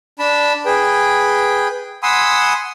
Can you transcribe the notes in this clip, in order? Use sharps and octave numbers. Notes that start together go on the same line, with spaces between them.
D4 A5 B5
G#4 B4 G5
F#5 G#5 B5 C6 D#6 E6